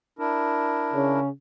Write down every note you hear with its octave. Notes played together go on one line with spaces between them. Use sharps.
D4 E4 A#4
C#3 C#4